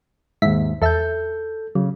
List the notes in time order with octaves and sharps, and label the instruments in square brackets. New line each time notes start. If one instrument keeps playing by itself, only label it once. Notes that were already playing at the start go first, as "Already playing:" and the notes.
[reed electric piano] D#2 G#2 [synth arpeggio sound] E5 B6
[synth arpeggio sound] E2 E5 A5 [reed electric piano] A4 G6
[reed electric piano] C#3 [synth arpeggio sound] F#3